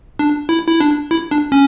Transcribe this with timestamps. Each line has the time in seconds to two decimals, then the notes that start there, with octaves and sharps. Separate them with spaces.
0.19 D4
0.49 E4
0.68 E4
0.80 D4
1.11 E4
1.31 D4
1.52 C#4